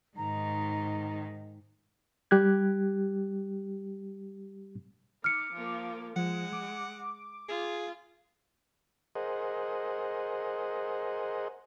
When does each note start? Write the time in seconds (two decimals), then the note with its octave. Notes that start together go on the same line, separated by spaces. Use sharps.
0.17 G#2 D#3 A#5
2.31 G3 G4 F#6 G#6
5.24 D#4 D6 F6 C#7
5.53 F3 A#3
6.16 F3 G#3 F#5
6.53 D6
7.49 F4 G#4
9.15 G#4 A#4 C5 D#5 F#5